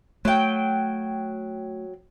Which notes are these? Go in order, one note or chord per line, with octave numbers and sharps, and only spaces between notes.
F#3 A3 G5